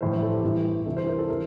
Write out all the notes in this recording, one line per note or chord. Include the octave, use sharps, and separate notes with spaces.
A#1 A2 E3 C5
C5
A4
G4
A1 G2 E3
D2 C3 E3 A4
C5
A#4
A4
C3 E3 A#4